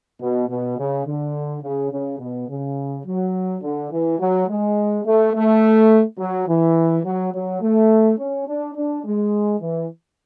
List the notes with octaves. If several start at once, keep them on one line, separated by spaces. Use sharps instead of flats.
B2
B2
C#3
D3
C#3
C#3
B2
C#3
F#3
D3
E3
F#3
G#3
A3
A3
F#3
E3
F#3
F#3
A3
C#4
D4
D4
G#3
E3